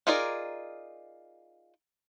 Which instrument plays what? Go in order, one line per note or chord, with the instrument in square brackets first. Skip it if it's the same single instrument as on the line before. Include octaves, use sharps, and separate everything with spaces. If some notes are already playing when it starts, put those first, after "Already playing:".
[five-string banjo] D#4 F4 G#4 A#4 D5